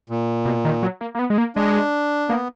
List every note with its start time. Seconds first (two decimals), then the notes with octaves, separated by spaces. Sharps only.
0.10 A#2
0.45 B2
0.65 D#3
0.83 F#3
1.01 A#3
1.15 A#3
1.19 B3
1.30 G#3
1.38 A#3
1.56 G#3 D4
2.29 A#3 B3